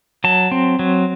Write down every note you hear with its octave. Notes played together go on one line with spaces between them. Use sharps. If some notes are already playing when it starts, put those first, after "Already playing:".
F#3 A5
C4
F#3